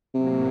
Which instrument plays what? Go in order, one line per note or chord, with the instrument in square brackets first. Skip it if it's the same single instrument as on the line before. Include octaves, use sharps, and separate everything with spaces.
[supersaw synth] A2 F#3 A#3 [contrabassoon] C3